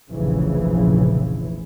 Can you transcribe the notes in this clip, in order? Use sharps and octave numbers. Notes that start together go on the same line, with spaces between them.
F1 A#1 C#3 E3 F3